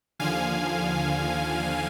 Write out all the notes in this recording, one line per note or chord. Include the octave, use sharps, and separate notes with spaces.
D#2 D3 F3 F5 G#5